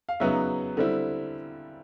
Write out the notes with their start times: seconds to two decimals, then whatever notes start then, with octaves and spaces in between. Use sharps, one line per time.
0.09 F5
0.20 C#3 F#3 B3 D#4 E5
0.77 D3 G3 C4 E4